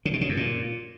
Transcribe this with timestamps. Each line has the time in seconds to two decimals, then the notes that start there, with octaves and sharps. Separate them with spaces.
0.05 C#3
0.13 B2
0.21 C#3
0.29 F#2
0.37 A#2